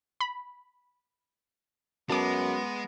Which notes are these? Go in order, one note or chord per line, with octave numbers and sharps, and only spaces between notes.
B5
F#2 G#3 B3 A5 D6